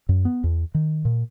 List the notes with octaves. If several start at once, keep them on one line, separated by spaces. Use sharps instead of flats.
F#2
B3
E2
D#3
A#2